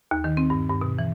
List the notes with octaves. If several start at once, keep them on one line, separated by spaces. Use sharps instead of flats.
D#2
D#3
C4
G2
G2
B2
E3